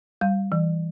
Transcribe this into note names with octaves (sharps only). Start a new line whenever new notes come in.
G3 F5
E3